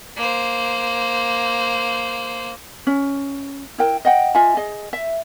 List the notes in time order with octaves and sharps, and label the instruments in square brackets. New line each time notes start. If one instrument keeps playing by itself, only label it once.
[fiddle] A#3 C5
[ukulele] C#4
E4 A#4 G5
D#5 F#5 G5
F4 D#5 E5 G#5
G#4 D#5
E5